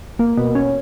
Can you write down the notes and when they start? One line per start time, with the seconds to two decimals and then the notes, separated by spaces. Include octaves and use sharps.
0.19 A#3
0.37 B2
0.55 C#4